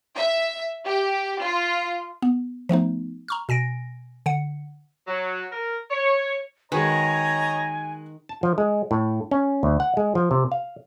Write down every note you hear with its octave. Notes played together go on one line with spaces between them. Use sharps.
E5
G4
F4
B3
F3 A3 B3 D#4
A#5 C#6 F6
B2 G#5 A#6 D7
D3 F#5 C#7
F#3
A#4
C#5
D#3 G#3 F#4 B4 C#5 D#5 G#5 A#5
A5
F3
G#3
A2
C#4
D2
F#5
G#3
F3
C3
F5